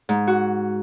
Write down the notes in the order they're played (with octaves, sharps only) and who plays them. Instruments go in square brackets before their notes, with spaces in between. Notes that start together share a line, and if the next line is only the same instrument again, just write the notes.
[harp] G#2
F#4